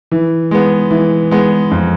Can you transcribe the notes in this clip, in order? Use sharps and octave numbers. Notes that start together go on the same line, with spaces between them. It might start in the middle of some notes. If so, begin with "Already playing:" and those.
E3
G#3 B3
E3
G#3 B3
F2